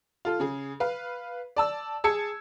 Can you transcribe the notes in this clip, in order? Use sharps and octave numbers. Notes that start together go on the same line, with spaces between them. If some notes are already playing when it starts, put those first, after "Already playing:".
F4 A4
C#3 G#4
B4 F5
D5 A5 E6
G#4 A5 E6 G#6 C#7